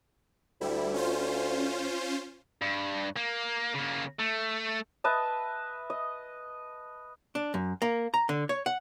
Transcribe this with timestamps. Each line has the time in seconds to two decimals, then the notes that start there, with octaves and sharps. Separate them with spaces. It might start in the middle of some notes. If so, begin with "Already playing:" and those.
0.61 D2 G3 E4
0.94 C#4 F4 C5
2.61 G2
3.16 A#3
3.74 C#3 A#3
4.19 A3
5.04 B4 D#5 E5 A5
5.90 D#5
7.35 D4
7.54 F#2
7.82 A#3
8.14 A#5
8.29 D3
8.49 C#5
8.66 F#5